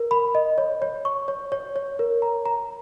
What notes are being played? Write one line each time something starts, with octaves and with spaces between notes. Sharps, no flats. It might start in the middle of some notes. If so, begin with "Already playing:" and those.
Already playing: A#4
B5
D#5
C#5
C#5
C#6
C#5
C#5
C#5
A#4
A#5
A#5